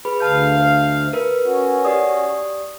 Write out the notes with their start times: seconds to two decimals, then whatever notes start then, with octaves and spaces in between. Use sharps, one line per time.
0.05 G#4 B4 B5
0.20 D2 F5 A5 G6
1.13 A#4 B4
1.44 C#4 F#4
1.85 G4 D5 D#6